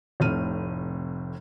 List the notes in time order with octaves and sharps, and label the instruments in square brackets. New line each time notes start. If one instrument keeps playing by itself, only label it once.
[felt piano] F1 A2 C3 F6 D#7